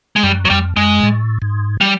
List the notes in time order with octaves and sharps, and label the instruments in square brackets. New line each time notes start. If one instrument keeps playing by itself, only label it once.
[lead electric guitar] G#3
[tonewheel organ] F#2 [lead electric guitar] G3
[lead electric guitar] F#3
[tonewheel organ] F2 [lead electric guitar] G3
[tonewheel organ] F#2 [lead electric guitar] G#3
[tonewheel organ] A2
G#2
[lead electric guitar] G3